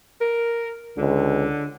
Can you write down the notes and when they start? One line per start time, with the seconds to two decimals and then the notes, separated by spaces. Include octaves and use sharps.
0.21 A#4
0.97 C#2 D3